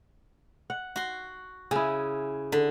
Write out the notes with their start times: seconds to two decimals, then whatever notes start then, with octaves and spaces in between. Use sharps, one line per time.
0.70 F#5
0.96 F#4 C6
1.71 C#3 E4 G#4
2.52 D3